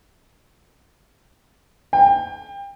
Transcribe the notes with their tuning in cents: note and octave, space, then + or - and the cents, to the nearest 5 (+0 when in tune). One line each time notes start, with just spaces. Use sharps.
G5 +25